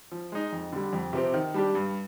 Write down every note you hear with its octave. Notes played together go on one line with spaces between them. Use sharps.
F3
G#3 D#4
F2
D3 G3
F2
C3 F3 C4 G4
D#3
G3 D4 G4
G2